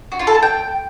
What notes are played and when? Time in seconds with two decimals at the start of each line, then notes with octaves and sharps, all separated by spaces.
0.12 F#4
0.19 F4
0.27 A4
0.35 A5
0.43 G5